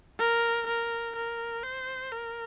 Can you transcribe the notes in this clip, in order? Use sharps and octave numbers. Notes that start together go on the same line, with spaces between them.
A#4
A#4
A#4
C5
A#4